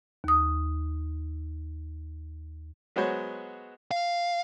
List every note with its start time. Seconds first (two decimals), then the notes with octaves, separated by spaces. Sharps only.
0.24 D#2 D#6
2.96 F#3 G#3 B3 F#4 C5 C#5
3.91 F5